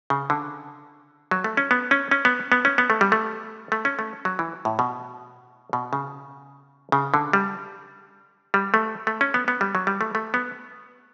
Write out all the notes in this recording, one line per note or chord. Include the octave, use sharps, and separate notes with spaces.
C#3
D3
F#3
A3
C#4
B3
C#4
C#4
B3
B3
C#4
B3
A3
G3
A3
A3
C#4
A3
F#3
E3
A2
B2
B2
C#3
C#3
D3
G3
G3
A3
A3
C#4
B3
B3
G3
F#3
G3
A3
A3
B3